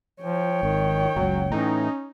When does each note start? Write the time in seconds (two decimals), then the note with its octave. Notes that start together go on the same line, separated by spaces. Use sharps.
0.22 F3 C#5 G5
0.63 G#1 D#3
1.16 F#1 C#2 F#3
1.52 A2 E3 C#4 D#4